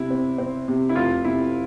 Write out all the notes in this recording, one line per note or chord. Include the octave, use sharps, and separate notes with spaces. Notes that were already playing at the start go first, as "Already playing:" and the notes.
Already playing: C3 E4
C4
C4
C3
E4
F1 F4
C3 E4